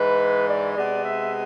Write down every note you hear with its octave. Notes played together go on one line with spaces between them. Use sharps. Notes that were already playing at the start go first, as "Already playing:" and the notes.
Already playing: G#2 E3 G#3 B4
D5
C3 G#3 B3 D5
E5